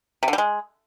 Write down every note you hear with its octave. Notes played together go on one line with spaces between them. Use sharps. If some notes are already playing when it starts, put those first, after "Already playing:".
C3
D3
G3
G#3